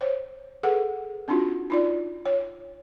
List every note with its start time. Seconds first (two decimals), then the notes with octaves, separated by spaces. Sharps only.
0.01 C5 C#5
0.63 G#4 A4 B4 F#5
1.28 C4 D4 D#4 F4 F#4
1.70 D#4 F4 D5
2.26 C#5